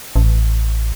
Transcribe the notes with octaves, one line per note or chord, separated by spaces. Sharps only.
A1